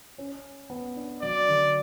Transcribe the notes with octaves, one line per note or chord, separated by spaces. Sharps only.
C#4
B3
D4
F#3 D5
D3